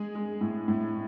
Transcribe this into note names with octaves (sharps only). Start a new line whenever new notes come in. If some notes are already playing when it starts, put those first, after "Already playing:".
Already playing: G#3 G#4
G#3
A2
A2